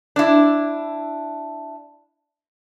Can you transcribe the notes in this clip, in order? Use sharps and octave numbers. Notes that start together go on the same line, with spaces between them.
D4 E4